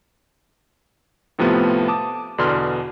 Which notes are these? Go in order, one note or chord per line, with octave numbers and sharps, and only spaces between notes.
A2 C3 F3 A3 B3
A5 D6 D#6
E2 B2 D3 D4 C6 F6